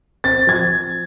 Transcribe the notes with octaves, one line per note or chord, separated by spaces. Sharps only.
C4 A6
F3 G#6